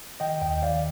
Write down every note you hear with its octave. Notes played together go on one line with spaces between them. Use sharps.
D#3 D#5 G5
D#2 D#5 G5
D#3 D5 F5